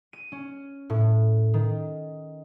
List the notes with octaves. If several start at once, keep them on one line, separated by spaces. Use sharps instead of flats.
D#7
C#4
A2
D#3